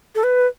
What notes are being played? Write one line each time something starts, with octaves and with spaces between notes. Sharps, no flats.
A4
B4